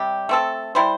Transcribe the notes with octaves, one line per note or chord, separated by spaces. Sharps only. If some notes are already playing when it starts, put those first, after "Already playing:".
Already playing: C3 G3 G4
A3 C4 A4
G3 E4 C5